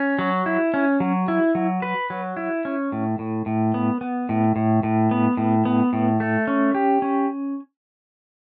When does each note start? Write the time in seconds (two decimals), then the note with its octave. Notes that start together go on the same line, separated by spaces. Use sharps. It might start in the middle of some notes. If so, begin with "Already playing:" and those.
Already playing: C#4
0.19 F#3
0.46 E4
0.74 C#4
1.00 F#3
1.28 E4
1.55 F#3
1.82 B4
2.10 F#3
2.37 E4
2.65 C#4
2.92 A2
3.19 A2
3.46 A2
3.74 B3
4.01 B3
4.29 A2
4.56 A2
4.83 A2
5.11 B3
5.37 A2
5.65 B3
5.93 A2
6.20 A3
6.47 C#4
6.74 G4
7.02 C#4